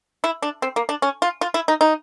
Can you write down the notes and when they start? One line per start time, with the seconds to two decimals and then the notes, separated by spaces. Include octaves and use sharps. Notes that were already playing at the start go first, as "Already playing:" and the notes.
0.24 E4
0.42 D4
0.62 C4
0.76 A#3
0.89 D4
1.02 C#4
1.22 F4
1.41 F4
1.54 E4
1.68 D#4
1.81 D#4